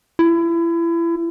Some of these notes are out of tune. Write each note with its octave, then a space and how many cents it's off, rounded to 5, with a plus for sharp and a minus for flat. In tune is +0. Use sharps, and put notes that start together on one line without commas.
E4 +30